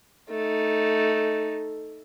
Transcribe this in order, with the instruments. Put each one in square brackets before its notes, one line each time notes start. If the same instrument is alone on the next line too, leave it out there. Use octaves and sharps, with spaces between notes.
[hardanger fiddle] A3 D#4